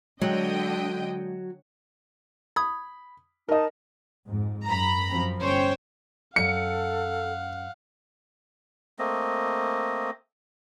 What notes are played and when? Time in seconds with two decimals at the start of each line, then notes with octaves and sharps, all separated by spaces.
0.22 D3 F#3 G#3 D#5 G5
2.56 B5 D#6 G#6
3.49 D#4 A#4 D#5 A5
4.28 F2 G#2
4.66 F#2 A#5 B5
5.11 F#2 F3 C4
5.42 G1 C#4 C5 C#5 G5
6.36 F#2 A4 F5 F#5 C#7
8.99 A3 A#3 C4 D#5